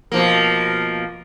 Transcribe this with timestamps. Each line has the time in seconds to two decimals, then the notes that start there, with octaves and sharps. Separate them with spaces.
0.12 B2 F3 A#3